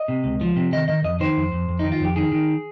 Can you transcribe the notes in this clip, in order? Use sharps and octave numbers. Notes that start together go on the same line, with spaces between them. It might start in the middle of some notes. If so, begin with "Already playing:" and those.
Already playing: D#5
C3
C#2
F3
C3
D#3 D#5
D#3 D#5
F2 D#5
D#3 C5
F2
F2
F2
D#3 D#4
F4
F2 G4
D#3 G#4
D#3